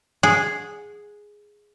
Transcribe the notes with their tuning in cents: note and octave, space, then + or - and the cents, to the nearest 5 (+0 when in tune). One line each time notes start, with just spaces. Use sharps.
G#4 +0 F#5 -20